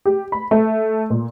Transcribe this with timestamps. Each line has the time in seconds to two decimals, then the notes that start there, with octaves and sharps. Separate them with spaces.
0.06 G4
0.32 B5
0.51 A3
1.10 A#2